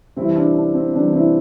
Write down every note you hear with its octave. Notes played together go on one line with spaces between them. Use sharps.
C3 E3 G3 C4 E4
D4
D4
C4
C3 E3 G3 D4
C4 E4